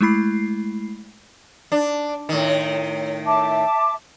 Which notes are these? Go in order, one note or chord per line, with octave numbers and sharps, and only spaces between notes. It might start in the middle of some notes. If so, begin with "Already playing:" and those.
G#3 A3 E4 B5 C7
D4
A2 D#3
E5 A5 D6